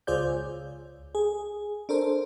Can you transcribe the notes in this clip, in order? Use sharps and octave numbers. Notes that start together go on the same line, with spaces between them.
C#2 F4 G#4 C5 D5 G6
C#2
G#4
D4 A4 A#4 C5